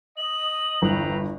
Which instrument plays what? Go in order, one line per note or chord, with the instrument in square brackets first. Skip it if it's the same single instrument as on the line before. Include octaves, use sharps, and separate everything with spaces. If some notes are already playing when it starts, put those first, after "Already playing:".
[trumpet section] D#5 [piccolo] F#7
[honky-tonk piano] G1 E2 G2 [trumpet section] C4 B4 A#5